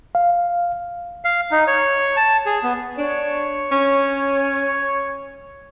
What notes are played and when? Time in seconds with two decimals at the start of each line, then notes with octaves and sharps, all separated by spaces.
0.15 F5
1.25 F5
1.51 D#4
1.67 C#5
2.17 A5
2.46 G#4
2.63 B3
2.98 D4 C#5
3.72 C#4